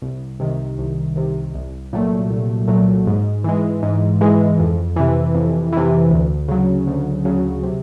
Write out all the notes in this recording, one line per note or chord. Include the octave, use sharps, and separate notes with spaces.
C2
C3 D#3
C2
C3 D#3
C2
A#2 F#3 A3
C2
A#2 F#3 A3
G#2
E3 G#3
G#2
E3 G#3
F2
C3 E3
F2
C3 E3
D2
C#3 F#3
D2
C#3 F#3
C3